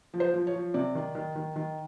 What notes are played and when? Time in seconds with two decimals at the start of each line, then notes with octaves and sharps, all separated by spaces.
0.14 F3
0.20 C5
0.34 F3
0.47 C#5
0.54 F3
0.74 C3 D5
0.95 D#3
1.15 D#3
1.35 D#3
1.56 D#3